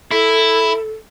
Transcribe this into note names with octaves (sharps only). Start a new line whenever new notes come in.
E4 A4